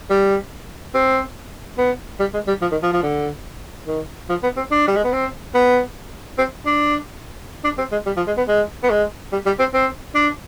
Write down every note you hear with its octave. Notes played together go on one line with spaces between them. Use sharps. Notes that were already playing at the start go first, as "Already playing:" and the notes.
G3
C4
B3
G3
G#3
G3
F3
D#3
F3
F3
D3
D#3
F3
B3
C4
D4
G3
G#3
B3
C4
B3
C4
D4
D4
C4
G#3
G3
F3
G#3
B3
G#3
B3
G#3
G3
G3
C4
C4
D4